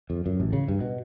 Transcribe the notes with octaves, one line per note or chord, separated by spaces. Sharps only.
F2
F#2
A1
C#3
G2
B2